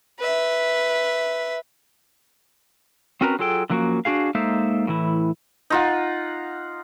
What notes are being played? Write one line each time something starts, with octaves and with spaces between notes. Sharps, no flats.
B4 E5
C4 C#4 F#4 A#4 B4 A#5
F#3 F4 G#4 A4 G5
D3 F3 F#3 A#3 C#4 F#4
D4 F#4 G#4 F5
G#3 A#3 D#4 A4 C5 E5
A2 E3 E4
D#4 F4 F#5